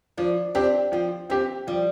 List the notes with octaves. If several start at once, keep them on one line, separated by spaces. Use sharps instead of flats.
F3 D4
C4 D4 G4
F3 C4
A#3 C4 G4
F3 G3